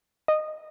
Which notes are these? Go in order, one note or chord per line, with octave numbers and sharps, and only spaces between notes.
D#5